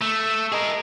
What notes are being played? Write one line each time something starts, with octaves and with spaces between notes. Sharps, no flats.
A3 E6
G#4 A#4 D#5